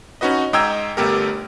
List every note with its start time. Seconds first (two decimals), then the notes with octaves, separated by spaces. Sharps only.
0.21 C#4 D#4 F#4 B4 D#5
0.53 G#2 D#5 G5 A#5 E6 G#6
0.97 G1 A3 B3 G4 A4 A#4